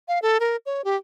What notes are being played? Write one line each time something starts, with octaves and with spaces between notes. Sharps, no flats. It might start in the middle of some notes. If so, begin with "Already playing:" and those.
F5
A4
A#4
C#5
G4